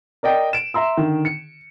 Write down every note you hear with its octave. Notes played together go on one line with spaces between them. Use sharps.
A#4 D5 D#5 G5
D7 E7
E5 A#5 C6 E6
D3 D#3
C#7